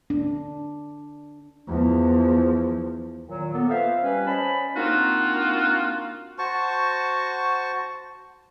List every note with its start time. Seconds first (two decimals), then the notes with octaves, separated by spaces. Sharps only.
0.10 D4
1.68 E2 F3
3.29 A#2 D#3 F#3
3.53 A#3 B3 A4
3.70 F4 B4 C5 E5 F5
4.03 G3 C#4 B4
4.27 C#4 C5 D#5 G#5 A5 B5
4.76 A#3 C4 D4 D#4 F4 F#4
6.38 F#4 C5 A5 C#6